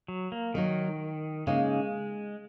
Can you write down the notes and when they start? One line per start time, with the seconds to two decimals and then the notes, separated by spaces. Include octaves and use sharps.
0.08 F#3
0.32 A#3
0.54 D#3 F#3 D#4 A#4
1.47 C#3 G#3 A#3 D#4